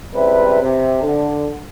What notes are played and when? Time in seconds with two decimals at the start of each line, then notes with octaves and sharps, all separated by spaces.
0.14 C#2 C3 G3 E4 B4
0.61 C3
1.02 D3